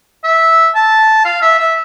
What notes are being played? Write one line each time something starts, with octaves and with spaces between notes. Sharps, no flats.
E5
A5
F5
E5
E5